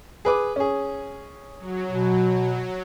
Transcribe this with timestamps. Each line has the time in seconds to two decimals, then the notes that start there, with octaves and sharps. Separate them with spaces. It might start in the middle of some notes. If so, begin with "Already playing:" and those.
0.25 G#4 B4 D6
0.56 C#4 G#4
1.58 F#3
1.91 B2